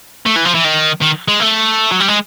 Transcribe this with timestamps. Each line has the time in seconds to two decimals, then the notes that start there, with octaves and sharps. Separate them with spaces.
0.26 A3
0.36 E3
0.45 F3
0.55 E3
0.65 D#3
1.02 D#3
1.28 G#3
1.40 A3
1.91 F#3
2.00 G3
2.08 G#3